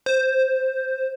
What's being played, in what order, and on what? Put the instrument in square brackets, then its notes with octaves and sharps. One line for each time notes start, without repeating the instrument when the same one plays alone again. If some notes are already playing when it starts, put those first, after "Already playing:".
[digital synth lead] C5